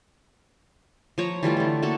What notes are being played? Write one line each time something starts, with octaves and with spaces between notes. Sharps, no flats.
F3 C#5 A#5
E3 G3 A3 F4
D3 A3
A3 A#3 F#4 A4